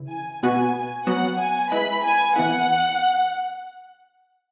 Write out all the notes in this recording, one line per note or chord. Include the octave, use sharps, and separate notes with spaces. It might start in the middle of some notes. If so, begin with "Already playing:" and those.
Already playing: C#3 E3 E4
G#5
B2 B3 F#4 B4 G#5
F#3 B3 F#4 F#5
G#5
G#3 E4 B4 B5
G#5
E3 B3 E4 B4 F#5